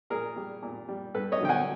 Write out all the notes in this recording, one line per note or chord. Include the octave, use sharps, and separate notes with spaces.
A#2 G#4 A#4
G3
A#2
G3
G2 A4 B4
C#5 D#5
D3 F#3 G5
F#5 G#5